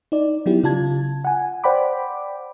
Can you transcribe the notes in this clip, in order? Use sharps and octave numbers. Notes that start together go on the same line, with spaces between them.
D#4 D5
F#3 B3 E4 G4
C#3 F4 A5 G#6
F#5 G#5
C5 D5 F#5 G5 B5 D6